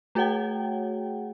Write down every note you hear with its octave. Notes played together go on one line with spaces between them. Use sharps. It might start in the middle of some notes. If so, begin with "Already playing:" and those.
A3 F#4 G#4 C#5 F#5 G5